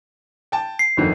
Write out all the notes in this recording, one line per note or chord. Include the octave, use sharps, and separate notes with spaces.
G5 A5
C7
G1 F2 D#3